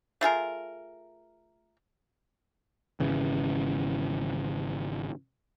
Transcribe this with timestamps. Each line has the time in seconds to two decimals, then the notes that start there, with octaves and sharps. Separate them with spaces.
0.21 A3 F4 G#4 A#4
3.00 G#1 C#3 E3